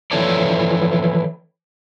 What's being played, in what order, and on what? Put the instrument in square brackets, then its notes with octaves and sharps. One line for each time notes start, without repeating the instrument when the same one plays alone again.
[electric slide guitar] E3 F3 E4 A4 C#5 D5